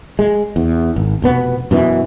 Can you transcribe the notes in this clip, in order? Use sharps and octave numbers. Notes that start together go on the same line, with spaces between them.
G#3
E2
G#1
F1 B2 B3
F#2 B2 E3